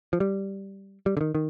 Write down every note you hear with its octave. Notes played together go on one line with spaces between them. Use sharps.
F3
G3
G3
D3
D#3
D#3